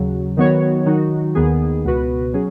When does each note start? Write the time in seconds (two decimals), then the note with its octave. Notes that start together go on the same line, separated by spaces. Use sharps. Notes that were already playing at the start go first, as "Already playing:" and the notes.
Already playing: D#2 C#3 F#3
0.37 D#3 F#3 B3 F#4 C#5
0.86 D#3 F#3 D#4 F#4
1.35 D#2 D#3 B3 G#4
1.84 C#2 B2 B3 F#4 B4
2.33 F#3 C#4 G#4